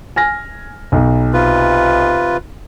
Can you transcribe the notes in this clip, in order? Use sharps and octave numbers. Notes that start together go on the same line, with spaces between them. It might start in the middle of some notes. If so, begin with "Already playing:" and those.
G#5 F6 A#6
B1
C3 F4 B4